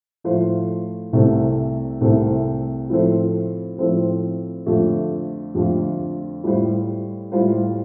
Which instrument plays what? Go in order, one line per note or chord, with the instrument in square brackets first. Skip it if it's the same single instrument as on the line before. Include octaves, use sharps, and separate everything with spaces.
[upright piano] A2 F3 A3 F4 C5
C2 C3 A3 C4
C2 C3 A3 C4
A2 F3 C4 A4 C5
A2 F3 C4 A4 C5
F2 D3 A3 F4
F2 D3 A3 F4
A2 G3 F4 C5
A2 G3 F4 C5